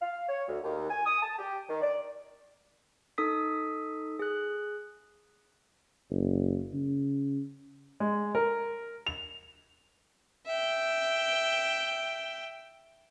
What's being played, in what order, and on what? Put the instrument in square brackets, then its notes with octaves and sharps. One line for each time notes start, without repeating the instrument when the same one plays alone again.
[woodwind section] F5
C#5
D2
D#2
G#5
D#6
A5
G4
D#3
D5
[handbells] D#4 A4 D#6 B6
G#4 F#6
[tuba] F#1
C#3
[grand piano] G#3
A#4
F7
[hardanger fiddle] E5 G5